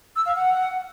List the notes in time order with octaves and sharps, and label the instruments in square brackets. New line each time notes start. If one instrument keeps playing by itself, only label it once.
[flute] E6
F5
F#5